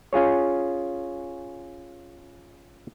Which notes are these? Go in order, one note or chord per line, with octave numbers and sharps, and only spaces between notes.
C#4 F4 G#4 C#5